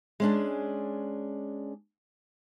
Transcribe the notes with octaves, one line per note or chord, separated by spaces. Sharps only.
G#3 C#4 D4